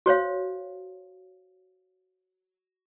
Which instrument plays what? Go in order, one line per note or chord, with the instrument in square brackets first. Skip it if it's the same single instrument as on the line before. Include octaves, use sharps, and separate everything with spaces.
[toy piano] F#4 C5 C#5 F5